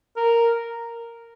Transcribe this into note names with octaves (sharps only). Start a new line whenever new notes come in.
A#4